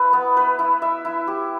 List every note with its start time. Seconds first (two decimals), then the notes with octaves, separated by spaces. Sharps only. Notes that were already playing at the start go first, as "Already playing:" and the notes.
Already playing: E4 B4
0.13 B3
0.37 B4
0.59 E4
0.82 E5
1.05 E4
1.27 G4